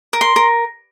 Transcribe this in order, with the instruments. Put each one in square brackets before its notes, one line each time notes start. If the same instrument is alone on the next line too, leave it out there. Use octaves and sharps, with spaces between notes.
[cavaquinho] A#4
C6
A#4